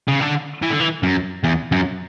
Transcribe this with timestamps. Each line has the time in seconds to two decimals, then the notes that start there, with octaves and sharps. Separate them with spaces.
0.08 C#3
0.21 D3
0.62 E3
0.70 D3
0.80 E3
1.03 F#2
1.44 E2
1.72 F#2